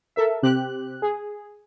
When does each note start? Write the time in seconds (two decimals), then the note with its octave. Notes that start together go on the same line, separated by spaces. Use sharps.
0.16 A4 A#4 E5
0.43 C3 C4 G4 F#6
1.02 G#4